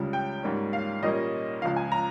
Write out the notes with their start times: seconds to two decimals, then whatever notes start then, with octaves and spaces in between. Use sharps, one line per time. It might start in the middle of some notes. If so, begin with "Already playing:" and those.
Already playing: C#2 C#3 G3
0.13 G5
0.43 G#2 G3 A#3 C#4
0.73 F5
1.02 A#2 G3 A#3 C#4 D#5
1.62 C#2 C#3 F3 F5
1.76 G#5
1.92 A#5